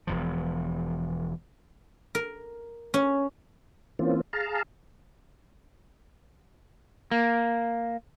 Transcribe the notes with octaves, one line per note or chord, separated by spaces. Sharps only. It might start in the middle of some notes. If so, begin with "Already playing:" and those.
E1 E2 F3
A#4
C#4
E3 A#3 C4 C#4 F4
G#4 F5 A5 A#5
A#3